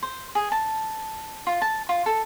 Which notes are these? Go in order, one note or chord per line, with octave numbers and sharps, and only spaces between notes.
C5
G#4
A5
F4
A5
F4
A4